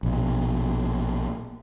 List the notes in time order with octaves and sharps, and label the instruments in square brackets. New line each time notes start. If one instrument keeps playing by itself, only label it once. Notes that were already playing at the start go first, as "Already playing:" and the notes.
[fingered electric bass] A#1 B2